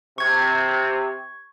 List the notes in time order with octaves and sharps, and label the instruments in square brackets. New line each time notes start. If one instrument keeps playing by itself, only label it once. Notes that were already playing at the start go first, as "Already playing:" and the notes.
[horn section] C3 [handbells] C#6 G#6